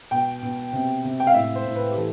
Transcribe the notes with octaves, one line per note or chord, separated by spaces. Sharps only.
B2 G5
B2
C3
C3
G5
F5
A2 E5
C5
A2
B4
G4
E3 A4